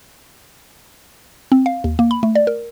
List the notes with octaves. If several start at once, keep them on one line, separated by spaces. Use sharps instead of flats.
C4
F5
D#2
A#3
B5
A3
D5
A#4